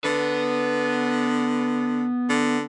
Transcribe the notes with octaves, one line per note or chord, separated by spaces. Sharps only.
D3 B3 B4
D3